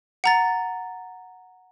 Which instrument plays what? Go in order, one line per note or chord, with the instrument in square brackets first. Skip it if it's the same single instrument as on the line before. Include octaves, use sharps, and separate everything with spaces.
[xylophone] F#5 A#5 A6